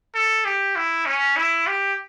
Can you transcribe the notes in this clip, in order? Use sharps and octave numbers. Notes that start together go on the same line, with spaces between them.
A4
G4
E4
C#4
E4
G4